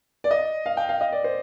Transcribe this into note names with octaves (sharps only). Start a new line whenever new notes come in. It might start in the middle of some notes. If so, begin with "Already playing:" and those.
D5
D#5
F5
G5
F5
D#5
D5
C5